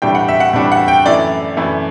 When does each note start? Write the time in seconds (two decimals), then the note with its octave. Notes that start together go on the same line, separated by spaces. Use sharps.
0.02 A2 E3 G3 D4 G5
0.15 F#5
0.29 E5
0.40 F#5
0.53 A2 E3 G3 D4
0.72 F#5
0.88 G5
1.05 F#2 E3 A3 E4 D5
1.57 F#2 E3 A3 E4